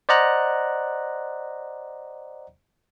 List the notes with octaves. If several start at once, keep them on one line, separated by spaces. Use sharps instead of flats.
C5 D5 D#5 F#5 A#5 F#6